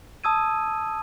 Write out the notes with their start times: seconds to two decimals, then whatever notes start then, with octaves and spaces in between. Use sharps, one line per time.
0.24 A5 D#6 E6 G#6 D#7